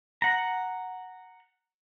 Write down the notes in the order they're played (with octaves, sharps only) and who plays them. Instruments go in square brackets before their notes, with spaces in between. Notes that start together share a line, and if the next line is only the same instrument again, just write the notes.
[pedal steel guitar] F#5 A#5